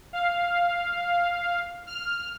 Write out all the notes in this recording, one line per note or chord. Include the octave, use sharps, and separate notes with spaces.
F5
F6